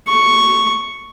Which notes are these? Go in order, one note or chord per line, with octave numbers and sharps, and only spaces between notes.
C#6